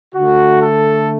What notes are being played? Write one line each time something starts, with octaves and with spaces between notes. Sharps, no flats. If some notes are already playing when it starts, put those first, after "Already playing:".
D3 A3 F#4
A4